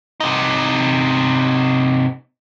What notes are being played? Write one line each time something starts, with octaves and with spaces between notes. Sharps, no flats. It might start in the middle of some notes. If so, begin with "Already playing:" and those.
C3 D#4